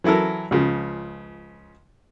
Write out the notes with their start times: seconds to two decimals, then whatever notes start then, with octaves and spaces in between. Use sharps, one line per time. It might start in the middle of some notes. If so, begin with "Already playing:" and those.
0.04 E3 F#3 E4 A4 A#4
0.51 C#2 C#3 F3